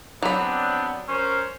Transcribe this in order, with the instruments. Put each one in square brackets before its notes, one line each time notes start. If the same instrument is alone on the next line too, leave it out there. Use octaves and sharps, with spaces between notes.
[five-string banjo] F#3 B5 [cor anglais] B3 [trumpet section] C4 D4
[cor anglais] C#4 [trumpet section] A#4 C5